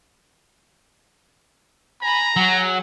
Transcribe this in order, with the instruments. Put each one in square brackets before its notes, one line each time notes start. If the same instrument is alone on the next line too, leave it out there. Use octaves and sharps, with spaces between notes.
[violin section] G#5 B5 [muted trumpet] A#5
[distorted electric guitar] F#3 [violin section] G#4 F#5